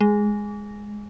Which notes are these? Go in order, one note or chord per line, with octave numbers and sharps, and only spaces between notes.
G#3